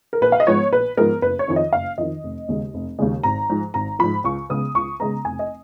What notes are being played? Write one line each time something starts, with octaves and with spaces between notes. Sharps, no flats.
A#4
A#1 B4
F5
D#5
G#2 F3 G#3 B3 C#5
A#1 B4
G#2 F3 G#3 B3 A#4
F#1 B4
C#5
F2 D#3
D#5
F#1 F5
F2 D#3 D#5
F1
D#2 C#3 G#3
F1
D#2 C#3 G#3
G#1 A#5
G#2 F3
G#1 A#5
G#2 F3 B5
C#2 C#6
C#3 G#3 B3 D#6
C#2 C#6
C#3 G#3 B3 A#5
F1 G#5
D#5